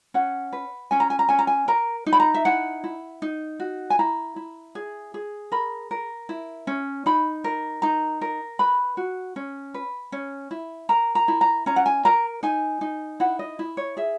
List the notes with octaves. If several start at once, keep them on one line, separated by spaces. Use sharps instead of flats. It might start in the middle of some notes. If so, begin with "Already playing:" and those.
C#4 F#5
B4
C#4 G#5
A#5
G#5
A#5
C#4 G#5
A#5
G#5
A#4 A#5
D#4
B5
A#5
E5
E4 F#5
E4
D#4
F#4
G#5
E4 A#5
E4
G#4
G#4
A#4 B5
A#4
E4
C#4
D#4 B5
A#4
D#4 A#5
A#4
B4 B5
F#4
C#4
B4
C#4
E4
A#4 A#5
A#5
E4
A#5
C#4 A#5
F#5
G#5
A#4 A#5
D#4 G#5
D#4
E4 F#5
D#5
E4
C#5
G#4 E5